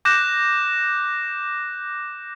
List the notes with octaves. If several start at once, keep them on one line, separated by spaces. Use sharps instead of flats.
D6 F#6 G6 A#6 E7